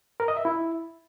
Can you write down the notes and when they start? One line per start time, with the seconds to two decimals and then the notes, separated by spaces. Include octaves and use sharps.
0.20 A#4
0.28 D#5
0.37 E5
0.45 E4